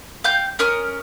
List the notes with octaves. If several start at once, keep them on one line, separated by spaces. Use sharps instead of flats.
F5 G5 G6
C#4 A#4 D#6 F6